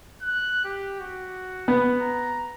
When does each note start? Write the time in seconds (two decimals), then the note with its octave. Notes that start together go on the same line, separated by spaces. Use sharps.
0.22 F#6
0.65 G4
1.00 F#4
1.68 B3
2.01 A#5